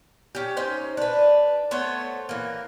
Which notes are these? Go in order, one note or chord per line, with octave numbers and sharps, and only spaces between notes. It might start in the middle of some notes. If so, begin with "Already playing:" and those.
C#4 G4
C#4 D#4 C5
D4 B4
A3 B3 C5 C#5
E3 A#3